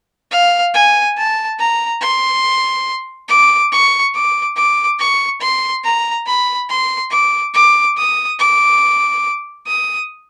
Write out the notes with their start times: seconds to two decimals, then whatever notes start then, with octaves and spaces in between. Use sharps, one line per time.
0.32 F5
0.74 G#5
1.17 A5
1.60 A#5
2.02 C6
3.29 D6
3.72 C#6
4.14 D6
4.56 D6
4.99 C#6
5.41 C6
5.84 A#5
6.27 B5
6.69 C6
7.11 D6
7.54 D6
7.98 D#6
8.40 D6
9.67 D#6